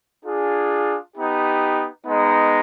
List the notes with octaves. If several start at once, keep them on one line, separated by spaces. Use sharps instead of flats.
D4 F4 G#4
B3 D#4 G4
G#3 B3 D#4